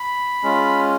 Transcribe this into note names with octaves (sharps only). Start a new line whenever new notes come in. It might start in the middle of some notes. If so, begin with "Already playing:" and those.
Already playing: B5
G#3 C#4 F4